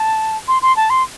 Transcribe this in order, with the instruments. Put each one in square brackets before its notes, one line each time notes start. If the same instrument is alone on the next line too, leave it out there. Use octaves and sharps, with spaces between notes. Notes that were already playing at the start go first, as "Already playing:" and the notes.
Already playing: [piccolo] A5
C6
C6
A5
C6